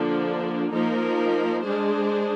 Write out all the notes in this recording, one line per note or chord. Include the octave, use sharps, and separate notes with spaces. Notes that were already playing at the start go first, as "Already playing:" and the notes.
Already playing: D3 F3 A#3 D4
F3 A#3 D#4 A#4
G#3 D4 G#4 C5